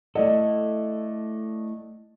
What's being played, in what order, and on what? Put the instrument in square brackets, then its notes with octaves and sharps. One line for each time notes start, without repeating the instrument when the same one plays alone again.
[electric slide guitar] A3 E4 A4 [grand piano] D5 D#5 F#5